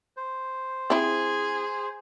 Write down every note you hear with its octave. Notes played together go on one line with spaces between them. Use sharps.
C5
C4 E4 G#4